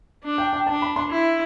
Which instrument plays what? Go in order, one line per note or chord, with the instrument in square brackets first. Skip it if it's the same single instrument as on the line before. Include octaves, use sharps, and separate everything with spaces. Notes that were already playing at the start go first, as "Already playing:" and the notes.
[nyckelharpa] D4
[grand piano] G5
G5
[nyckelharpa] D4 [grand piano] A5
[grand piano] B5
C6
[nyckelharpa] E4